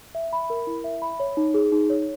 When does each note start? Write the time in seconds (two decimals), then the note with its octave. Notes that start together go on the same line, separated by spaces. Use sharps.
0.15 E5
0.33 B5
0.50 A#4
0.67 E4
0.84 E5
1.02 B5
1.20 C#5
1.37 D#4
1.54 G#4
1.72 D#4
1.90 C#5